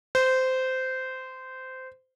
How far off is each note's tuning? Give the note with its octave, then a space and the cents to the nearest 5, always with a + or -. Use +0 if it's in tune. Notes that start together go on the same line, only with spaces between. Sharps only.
C5 -15